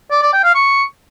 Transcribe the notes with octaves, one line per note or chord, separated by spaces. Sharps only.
D5
D5
G5
F5
C#6